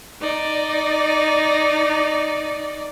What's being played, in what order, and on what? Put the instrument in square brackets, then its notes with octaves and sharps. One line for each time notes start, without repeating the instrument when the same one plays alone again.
[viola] D#4 D5